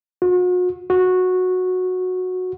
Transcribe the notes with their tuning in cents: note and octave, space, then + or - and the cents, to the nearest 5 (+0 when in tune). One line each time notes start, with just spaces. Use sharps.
F#4 -40
F#4 -10